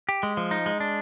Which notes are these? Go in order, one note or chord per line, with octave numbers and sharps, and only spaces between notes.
G4
G#3
F3
D#4
G#3
D4